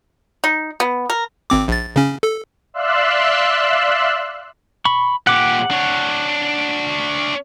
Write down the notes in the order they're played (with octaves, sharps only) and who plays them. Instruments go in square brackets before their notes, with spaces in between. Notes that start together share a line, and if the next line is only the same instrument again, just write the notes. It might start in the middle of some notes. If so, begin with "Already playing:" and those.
[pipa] D#4
B3
A#4
[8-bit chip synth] G#1 C4 D6
A#1 A6
C#3 C#4
A4
[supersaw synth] D5 E5 F5 C6 E6 F#6
[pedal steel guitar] B5 C#6
[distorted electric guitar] A#2 G4 [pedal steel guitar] F#5 D6
[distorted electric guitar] D4 C#5